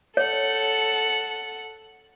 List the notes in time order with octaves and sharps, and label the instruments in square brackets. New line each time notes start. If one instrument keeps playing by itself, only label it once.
[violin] A4 F#5 [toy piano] C#5